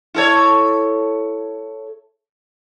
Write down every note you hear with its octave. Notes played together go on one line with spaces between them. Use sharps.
E4 A4 C#5